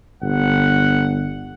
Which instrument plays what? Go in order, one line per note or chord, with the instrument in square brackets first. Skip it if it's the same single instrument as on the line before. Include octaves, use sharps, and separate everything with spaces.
[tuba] G1 [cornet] F#5